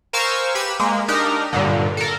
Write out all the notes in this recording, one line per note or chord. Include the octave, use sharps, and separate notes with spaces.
A#4 C5 F5 G#5 C#6 E6
G4 B4 B5 E6
G#3 A#3
D4 D#4 G4 A#4
G2 A#2 D3
A4 A#4